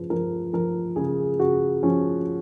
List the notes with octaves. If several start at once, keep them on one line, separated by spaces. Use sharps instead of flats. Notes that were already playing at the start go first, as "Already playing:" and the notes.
Already playing: C#3 F3 B4
F3 A#4
F3 A#4
C#3 G#4
C#3 F#4
F3 C#4